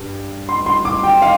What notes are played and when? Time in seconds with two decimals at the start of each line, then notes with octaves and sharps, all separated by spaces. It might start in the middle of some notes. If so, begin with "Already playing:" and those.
Already playing: G2
0.49 C6
0.66 C6
0.85 D6
1.03 G5
1.22 F5